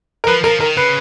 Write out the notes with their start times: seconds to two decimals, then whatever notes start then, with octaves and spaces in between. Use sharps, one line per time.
0.24 A#4
0.27 F3 B4
0.44 F3 A#4
0.60 D#3 A#4
0.76 C#3 B4